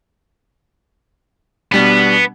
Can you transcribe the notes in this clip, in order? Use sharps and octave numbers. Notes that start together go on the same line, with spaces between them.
B2 G3 B3 D4